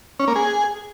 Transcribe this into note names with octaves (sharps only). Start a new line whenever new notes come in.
C#4
A#3
G#4